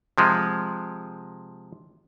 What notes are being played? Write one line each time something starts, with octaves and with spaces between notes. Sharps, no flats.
C3 F3 G#3